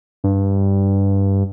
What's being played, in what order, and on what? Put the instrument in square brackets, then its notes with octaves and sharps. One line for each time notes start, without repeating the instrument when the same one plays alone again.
[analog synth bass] G2